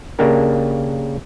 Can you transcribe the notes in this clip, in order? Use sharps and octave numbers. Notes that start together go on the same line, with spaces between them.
C#3 A#3 D4 G4 A#4